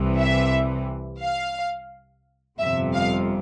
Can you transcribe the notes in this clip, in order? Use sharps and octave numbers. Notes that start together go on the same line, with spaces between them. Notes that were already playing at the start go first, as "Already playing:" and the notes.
Already playing: C2 C3 E3
E5
F5
G1 F2 C3 E5
F5